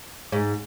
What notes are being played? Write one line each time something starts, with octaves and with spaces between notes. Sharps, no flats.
G#2